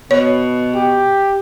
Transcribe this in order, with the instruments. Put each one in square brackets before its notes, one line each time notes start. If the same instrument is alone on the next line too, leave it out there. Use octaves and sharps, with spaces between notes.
[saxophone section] B2 [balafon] C#5
[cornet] G4